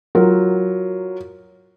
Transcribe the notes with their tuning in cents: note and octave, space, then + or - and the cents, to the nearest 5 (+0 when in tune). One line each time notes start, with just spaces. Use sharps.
F#3 +0 F4 +0 A#4 +0